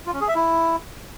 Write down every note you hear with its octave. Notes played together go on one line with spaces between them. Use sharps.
F4
C#4
G#4
E5
E4